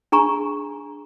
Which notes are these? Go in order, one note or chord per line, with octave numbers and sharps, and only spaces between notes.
D4 G#4 A#5 C#6